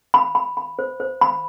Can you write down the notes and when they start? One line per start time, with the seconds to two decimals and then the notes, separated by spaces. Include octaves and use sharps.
0.14 B5
0.35 B5
0.57 B5
0.79 C5
1.00 C5
1.21 B5